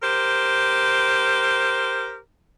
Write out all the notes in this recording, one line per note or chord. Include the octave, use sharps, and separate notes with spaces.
G4 A#4 C5